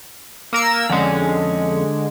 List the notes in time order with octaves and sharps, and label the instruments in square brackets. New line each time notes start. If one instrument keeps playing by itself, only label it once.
[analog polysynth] A#3 A#4 E6
[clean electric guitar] F2 C#4 [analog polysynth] D3 G#3